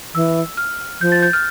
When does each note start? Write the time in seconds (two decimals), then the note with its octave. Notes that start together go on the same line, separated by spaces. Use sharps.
0.15 E3 E6
0.57 F6
1.01 F3 G6
1.12 A6
1.22 G6
1.33 F6